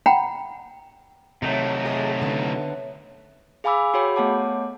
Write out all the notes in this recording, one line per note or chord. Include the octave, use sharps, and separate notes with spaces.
F#5 G5 A#5 B5
C3 D#3 F#3 A3 D#4 C#5 E5
G#4 D#5
D3 B3
G#4 F5 G#5 B5 D6 E6
F#4 G#4 C#5 G5 B5
A3 B3 C#5 F#5 A5 D6